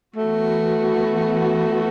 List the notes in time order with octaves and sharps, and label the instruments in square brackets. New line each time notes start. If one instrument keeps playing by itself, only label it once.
[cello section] E3 B3 F#4 [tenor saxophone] A3